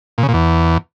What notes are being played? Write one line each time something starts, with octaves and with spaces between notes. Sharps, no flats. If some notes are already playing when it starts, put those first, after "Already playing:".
A#2
C#3
A#2
E2